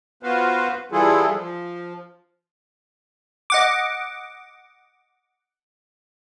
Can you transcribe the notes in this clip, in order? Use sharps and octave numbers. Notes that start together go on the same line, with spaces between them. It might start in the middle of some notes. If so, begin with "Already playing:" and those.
B3 F4 F#4 B4 C5 F5
E3 G3 E4 F4 G#4 A4
F3
D#5 F#5 D6